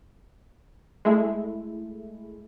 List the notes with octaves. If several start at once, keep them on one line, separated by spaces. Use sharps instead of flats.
G#3 A3 E4